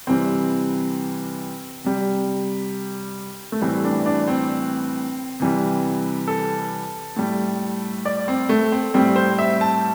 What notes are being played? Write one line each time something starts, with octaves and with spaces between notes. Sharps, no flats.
C3 E3 G3 C4
C3 G3
A3
A2 E3 G3 C4
D4
D4
C4
C3 E3 G3
A4
A2 G3
D5
C4
A3
C4
A2 G3 C4
C5
E5
A5